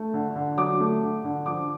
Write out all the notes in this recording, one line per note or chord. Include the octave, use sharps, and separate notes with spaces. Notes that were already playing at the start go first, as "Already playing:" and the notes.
Already playing: A3
D3
D3
F#3 D6
A3
D3
D3
F3 D6